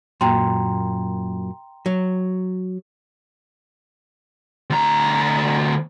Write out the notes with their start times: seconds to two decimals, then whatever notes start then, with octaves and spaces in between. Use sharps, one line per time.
0.21 F#2 A#2 G5 A#5 C6
1.86 F#3
4.70 D2 A#5